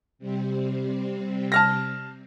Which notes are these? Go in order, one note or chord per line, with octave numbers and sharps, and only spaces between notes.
C3 G3 C4
A5 F6 A#6